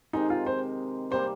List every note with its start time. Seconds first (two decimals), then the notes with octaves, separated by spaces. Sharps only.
0.13 C3 D#3 G#3 D#4
0.30 F4
0.46 C5
1.10 C3 G3 A#3 C5